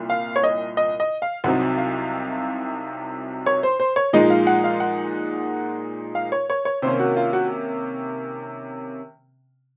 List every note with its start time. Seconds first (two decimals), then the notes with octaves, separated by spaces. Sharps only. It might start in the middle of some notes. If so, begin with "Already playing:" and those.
Already playing: C2 A#2
0.10 F5
0.36 C#5
0.44 D#5
0.77 D#5
1.00 D#5
1.22 F5
1.44 C2 C3 F#3 C4 D#4 F#5
1.78 F5
3.46 C#5
3.63 C5
3.80 C5
3.96 C#5
4.13 A#2 F3 G#3 D#4 D#5
4.30 F5
4.47 F#5
4.64 F5
4.80 F#5
6.15 F5
6.32 C#5
6.50 C#5
6.65 C#5
6.82 C3 D#3 A#3 C#4 C5
7.00 F#4
7.17 F4
7.33 F#4